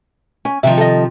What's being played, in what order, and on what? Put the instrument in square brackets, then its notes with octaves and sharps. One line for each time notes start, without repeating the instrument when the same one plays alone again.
[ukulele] C#4 [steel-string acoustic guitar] G#5
[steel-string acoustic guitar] C3 D#3 F3 [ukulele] E5
[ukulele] A4 D#5